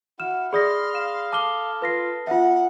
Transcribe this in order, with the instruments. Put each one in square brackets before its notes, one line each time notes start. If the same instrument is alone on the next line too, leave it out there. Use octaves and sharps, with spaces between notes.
[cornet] E4 [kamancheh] F#4 [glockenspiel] F6 [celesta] E7
[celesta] G#4 D5 [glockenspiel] B5 D#6 A#6 [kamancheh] C6 F6
[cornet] F5 [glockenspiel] E7
[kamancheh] A4 [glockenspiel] A5 F6 G7 [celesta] D6
[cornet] F4 [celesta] B4 A#6 C7
[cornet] B3 [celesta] F4 E5 [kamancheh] F#5